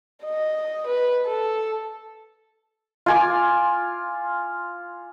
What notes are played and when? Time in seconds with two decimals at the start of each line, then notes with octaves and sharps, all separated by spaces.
0.24 D#5
0.87 B4
1.26 A4
3.06 F4 G#5 D6